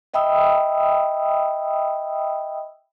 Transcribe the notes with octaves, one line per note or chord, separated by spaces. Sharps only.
D#5 E5 G5 B5 D#6 E6